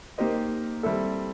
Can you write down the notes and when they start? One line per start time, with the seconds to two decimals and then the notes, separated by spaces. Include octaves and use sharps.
0.18 A#3 D#4 G4 C5 D#5
0.83 G3 C4 E4 A4